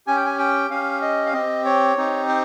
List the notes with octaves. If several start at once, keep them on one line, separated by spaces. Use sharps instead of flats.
C#4 G4 G#5
G5
G#5
G5
C#4 G4 F5
D#5
F5
C4 G4 D#5
C#5
C4 D#4 G4
C5